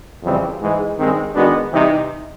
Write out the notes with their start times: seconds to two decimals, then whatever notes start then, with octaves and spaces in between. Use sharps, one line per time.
0.23 F2 C#3 E3 G3 C4
0.61 G#2 E3 G#3
0.98 G2 D#3 G#3 C4
1.35 D#3 G#3 B3 D4 F#4
1.71 C3 E3 G3 C4 D#4